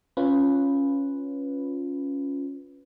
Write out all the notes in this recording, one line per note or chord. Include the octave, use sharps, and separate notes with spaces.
C#4 F4 B4